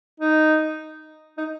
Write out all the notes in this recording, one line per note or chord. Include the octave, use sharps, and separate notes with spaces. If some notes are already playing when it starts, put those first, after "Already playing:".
D#4
D#4